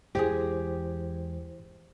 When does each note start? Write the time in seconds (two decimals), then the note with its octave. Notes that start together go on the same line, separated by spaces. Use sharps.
0.15 E2 G#3 E4 G4 G#4 C5